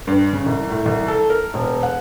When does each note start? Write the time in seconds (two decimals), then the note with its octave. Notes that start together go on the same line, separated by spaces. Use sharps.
0.07 G2
0.33 C#3
0.46 C2
0.70 A2
0.86 C2
1.08 A4
1.30 A#4
1.54 E1
1.83 F#5